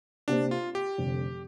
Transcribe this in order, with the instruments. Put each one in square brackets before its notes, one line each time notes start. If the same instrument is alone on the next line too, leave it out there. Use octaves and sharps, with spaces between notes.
[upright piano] C3 A#3 G4 C5 [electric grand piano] D4
[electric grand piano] F4
G4
[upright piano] F1 F2 D3 G3